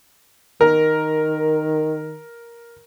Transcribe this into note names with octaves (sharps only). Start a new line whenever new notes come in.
D#3 A#4